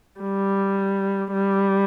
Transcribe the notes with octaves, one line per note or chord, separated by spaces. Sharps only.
G3
G3